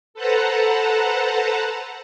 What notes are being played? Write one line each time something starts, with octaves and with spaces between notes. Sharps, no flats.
A4 B4 C5 F#5 A5 A#5